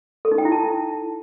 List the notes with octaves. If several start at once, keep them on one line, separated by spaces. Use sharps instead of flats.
A4
D#4
G5
E4
A5